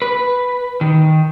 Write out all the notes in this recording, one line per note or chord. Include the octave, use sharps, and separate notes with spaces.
B4
D#3